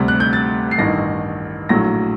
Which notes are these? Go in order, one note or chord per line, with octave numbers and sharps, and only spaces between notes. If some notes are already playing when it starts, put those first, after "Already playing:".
Already playing: D2 C3 G3
F#6
G6
A6
C7
A1 G2 D#3 A#6
A#1 A2 F#3 A#6